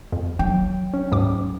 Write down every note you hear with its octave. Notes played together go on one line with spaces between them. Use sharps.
F2
F#3 G5
C#4
D2 G#2 D6